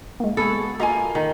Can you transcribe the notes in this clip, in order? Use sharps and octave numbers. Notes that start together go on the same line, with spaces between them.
G#3 A#3
B3 F#4 G#4 A4
A#3 F4 F#4 D#5 G#5
D#3